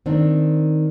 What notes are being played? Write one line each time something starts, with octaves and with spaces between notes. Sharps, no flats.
D#3 C4 D4